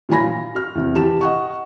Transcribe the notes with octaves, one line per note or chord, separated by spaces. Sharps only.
A#2 E3 F#3 G#5 B5 A#6
F4
F#4 F6
E2 C3
E3 G4 A5 E7
D#5 F#5 C#6